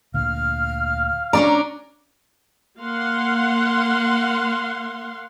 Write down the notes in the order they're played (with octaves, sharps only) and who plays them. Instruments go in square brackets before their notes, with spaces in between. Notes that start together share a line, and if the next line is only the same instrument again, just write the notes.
[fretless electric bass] D2 A#2 D3 [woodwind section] F5 F6
[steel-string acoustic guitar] C#4 D4 D5 [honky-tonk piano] A#5 D6
[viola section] A#3 F5 F#5 C6